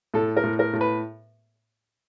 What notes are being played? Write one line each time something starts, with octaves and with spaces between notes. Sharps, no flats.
A2 A4
A#4
A2
A#4
A2
B4